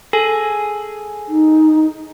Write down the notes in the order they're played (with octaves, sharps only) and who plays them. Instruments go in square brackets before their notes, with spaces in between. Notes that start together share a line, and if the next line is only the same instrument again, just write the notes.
[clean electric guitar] G#4 [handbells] A4
[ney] D#4